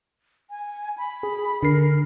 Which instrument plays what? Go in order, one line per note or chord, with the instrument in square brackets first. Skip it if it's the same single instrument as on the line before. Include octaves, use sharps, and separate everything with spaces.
[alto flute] G#5
B5
[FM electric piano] G#4
[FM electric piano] D3 C7 [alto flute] A#4